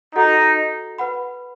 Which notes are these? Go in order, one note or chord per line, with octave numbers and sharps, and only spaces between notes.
D#4 F#4 A4 D#5 F#5
B4 F#5 B5